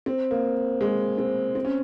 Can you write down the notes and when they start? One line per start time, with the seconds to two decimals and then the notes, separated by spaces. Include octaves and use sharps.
0.06 C4
0.31 A#3
0.81 G#3
1.18 C4
1.55 C4
1.65 C#4